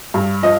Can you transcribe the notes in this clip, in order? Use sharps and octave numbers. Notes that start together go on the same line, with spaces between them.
G2
F3 D#5